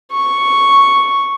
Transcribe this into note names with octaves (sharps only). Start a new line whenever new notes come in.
C#6